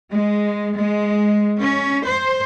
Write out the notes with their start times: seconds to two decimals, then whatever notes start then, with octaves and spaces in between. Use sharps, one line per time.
0.11 G#3
0.77 G#3
1.58 C#4
2.02 C5